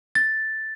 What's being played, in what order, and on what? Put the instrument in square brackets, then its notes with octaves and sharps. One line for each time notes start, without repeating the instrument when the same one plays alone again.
[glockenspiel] A6